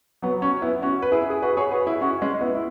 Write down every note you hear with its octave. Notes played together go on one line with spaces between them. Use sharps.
F#3 B3
C#4 F#4
B3 E4
C#4 F#4
B4
E4 G#4
G#4
F#4 B4
G#4 C#5
F#4 B4
E4 G#4
C#4 F#4
G#3 C#4
B3 E4
E4